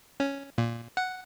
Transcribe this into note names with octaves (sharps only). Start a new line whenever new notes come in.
C#4
A#2
F#5